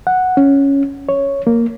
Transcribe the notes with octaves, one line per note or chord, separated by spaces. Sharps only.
F#5
C#4
C#5
A#3